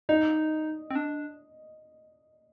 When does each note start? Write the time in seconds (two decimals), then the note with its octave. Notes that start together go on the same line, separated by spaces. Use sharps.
0.09 D#4 D#5
0.90 C4
0.95 D4